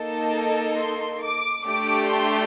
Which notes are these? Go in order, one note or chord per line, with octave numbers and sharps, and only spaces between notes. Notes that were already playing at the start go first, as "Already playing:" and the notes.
Already playing: A#3 D#4 A4 A5
C6
D6
A3 D4 G4 D6
C6